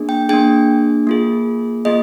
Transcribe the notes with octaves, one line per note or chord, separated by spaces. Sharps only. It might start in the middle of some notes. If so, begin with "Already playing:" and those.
Already playing: A#3 D4 G#4
G5
A#3 D4 G#4 G5
A#3 F4 G#4
A#3 F4 G#4 D#5